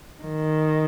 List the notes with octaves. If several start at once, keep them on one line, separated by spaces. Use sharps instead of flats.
D#3